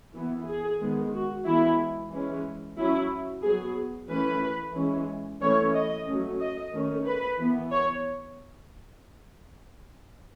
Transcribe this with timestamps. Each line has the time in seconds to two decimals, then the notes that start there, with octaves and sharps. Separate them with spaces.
0.14 E3 B3
0.47 G#4
0.80 D#3 G#3 B3
1.13 F#4
1.45 E3 G#3 B3 E4
2.11 E3 G#3 C#4
2.77 F#3 C#4 E4
3.43 F#3 B3 G#4
4.09 E3 A3 C#4 B4
4.75 E3 G#3 C#4
5.41 E3 A3 C#4 C#5
5.73 D#5
6.06 F#3 A3 C#4
6.40 D#5
6.73 D#3 A3 C#4
7.06 B4
7.38 E3 B3
7.71 C#5